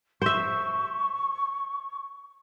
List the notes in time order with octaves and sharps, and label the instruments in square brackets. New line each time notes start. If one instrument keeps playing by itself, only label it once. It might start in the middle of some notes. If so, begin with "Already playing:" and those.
[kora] C5 E5 [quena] C#6